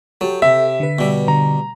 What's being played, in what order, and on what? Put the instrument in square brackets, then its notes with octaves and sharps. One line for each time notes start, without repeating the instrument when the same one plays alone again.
[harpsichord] F#3 [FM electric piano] G4 A4
[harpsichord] C3 [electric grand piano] E5
[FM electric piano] D3 B4
[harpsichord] B2 G3
[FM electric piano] D3 [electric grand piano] A#5